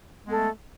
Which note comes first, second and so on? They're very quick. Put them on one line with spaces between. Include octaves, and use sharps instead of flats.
G#3 B3 A4 A3